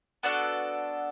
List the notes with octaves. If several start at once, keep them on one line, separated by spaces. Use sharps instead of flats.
B3 D4 F#4 A4